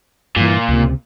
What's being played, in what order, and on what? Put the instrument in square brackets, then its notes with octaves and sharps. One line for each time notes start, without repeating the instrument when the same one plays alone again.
[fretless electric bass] G2 E3 [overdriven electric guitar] A#2
[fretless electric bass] C#2 C3